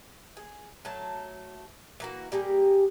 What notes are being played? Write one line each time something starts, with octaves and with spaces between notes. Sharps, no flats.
G#4
F#3 A3 A5
E3 A#3 F#4
G3 A#3 G4 G#4